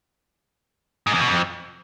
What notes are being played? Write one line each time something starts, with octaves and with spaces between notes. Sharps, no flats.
G#2
E2
B2
F2